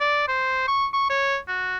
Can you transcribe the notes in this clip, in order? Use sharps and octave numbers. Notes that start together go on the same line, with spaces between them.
D5
C5
C#6
C#6
C#5
F#4